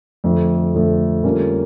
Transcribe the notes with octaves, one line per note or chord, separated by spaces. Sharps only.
F2 D3 F3 A3
F2 D3 F3 A3
D3 G3 A#3 C#4 F4